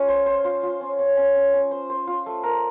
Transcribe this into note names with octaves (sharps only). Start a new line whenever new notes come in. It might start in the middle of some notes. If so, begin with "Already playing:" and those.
Already playing: C#4 F4
C5
C5
F4
F4
C#4
C#4
C#4
C#4
C#4
C5
C5
F4
A3
A#4